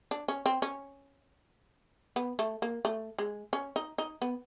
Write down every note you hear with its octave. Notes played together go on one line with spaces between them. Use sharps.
D4
C#4
C4
C#4
B3
A3
A#3
A3
G#3
C#4
D#4
D#4
B3